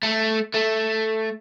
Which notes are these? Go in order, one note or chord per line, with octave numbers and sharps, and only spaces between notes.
A3
A3